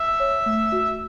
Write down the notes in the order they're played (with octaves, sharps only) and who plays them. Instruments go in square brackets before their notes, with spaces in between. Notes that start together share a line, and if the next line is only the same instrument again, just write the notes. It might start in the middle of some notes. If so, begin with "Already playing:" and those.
Already playing: [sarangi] E5
[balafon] C#5
A3
F#4